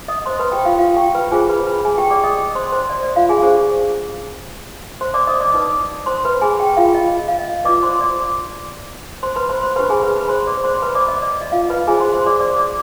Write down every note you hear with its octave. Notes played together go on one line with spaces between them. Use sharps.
D#5 D#6
C5 C6
B4 B5
G4 G5
F4 F5
F4 F5
G4 G5
B4 B5
F4 G#4 C5 G#5
B4 B5
B4 B5
G#4 G#5
G4 G5
D5 D6
D#5 D#6
C5 C6
C5 C6
D5
D5
F4 F5
G#4 G#5
D4 G4 G#4 C5 G#5
C5 C6
D5 D6
D#5 D#6
D5 D6
D#4 B4
C5 C6
B4 B5
G#4 G#5
G4 G5
F4 F5
D#5
F5
D#5
F4 B4 D5 D6
C5 C6
D5 D6
C5 C6
B4 B5
C5 C6
C5 C6
D4 G4 B4 C5 B5
G#4 G#5
B4 B5
B4 B5
C5 C6
D5 D6
C5 C6
B4 B5
D5 D6
D#5
D5
D#5
F4 F5
B4 B5
F4 G#4 C5 G#5
C5 C6
C5 C6
D5 D6
D5 D6
D5 D6